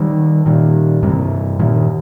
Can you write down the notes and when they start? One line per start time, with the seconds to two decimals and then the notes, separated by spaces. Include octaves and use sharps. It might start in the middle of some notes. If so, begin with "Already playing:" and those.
Already playing: D#3 G3
0.46 A#2 D#3
1.03 G2 C3
1.59 A#2 D#3